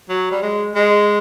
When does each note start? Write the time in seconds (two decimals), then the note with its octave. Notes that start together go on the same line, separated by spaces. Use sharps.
0.09 F#3
0.31 G3
0.42 G#3
0.75 G#3